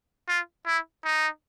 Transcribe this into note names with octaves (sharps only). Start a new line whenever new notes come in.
F4
E4
D#4